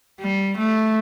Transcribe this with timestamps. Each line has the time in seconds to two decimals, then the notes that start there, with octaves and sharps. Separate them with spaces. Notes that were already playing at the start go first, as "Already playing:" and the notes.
0.20 G3
0.58 A3